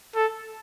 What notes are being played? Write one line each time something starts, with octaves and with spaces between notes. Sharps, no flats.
A4